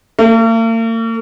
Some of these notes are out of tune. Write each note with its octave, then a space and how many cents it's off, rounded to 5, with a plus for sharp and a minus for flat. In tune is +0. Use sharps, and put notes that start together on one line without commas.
A#3 -45